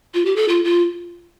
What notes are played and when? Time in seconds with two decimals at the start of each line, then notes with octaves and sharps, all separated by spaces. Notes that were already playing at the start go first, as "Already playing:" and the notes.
0.14 F4
0.25 G4
0.36 A4
0.48 F4
0.64 F4